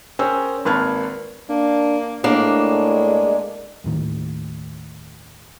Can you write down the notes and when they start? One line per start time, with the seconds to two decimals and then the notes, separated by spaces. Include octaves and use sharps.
0.19 C#4 G#4 A#4 C5 G5 E6
0.65 G#1 A#3 B4 A5 F6 G#6
1.49 A#3 D4
2.24 A2 G#3 A#3 D4
3.84 D#2 A2 D#3